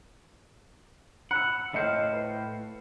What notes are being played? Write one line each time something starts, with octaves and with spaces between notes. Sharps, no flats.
F#5 B5 E6
A2 C5 D#5 F5 C#7
B4